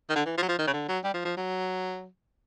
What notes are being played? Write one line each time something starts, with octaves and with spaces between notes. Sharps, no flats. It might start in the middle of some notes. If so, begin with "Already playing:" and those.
D#3
D3
E3
F3
F#3
F3
D#3
C#3
D3
F#3
G3
F3
F3
F#3